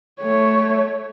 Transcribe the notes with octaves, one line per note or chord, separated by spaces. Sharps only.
A3 C#5